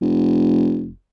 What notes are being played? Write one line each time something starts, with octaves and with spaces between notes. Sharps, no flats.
F1